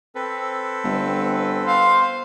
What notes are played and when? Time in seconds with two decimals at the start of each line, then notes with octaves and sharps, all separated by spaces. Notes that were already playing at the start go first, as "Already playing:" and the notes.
0.15 C4 A4 B4
0.84 G1
1.65 C5 F5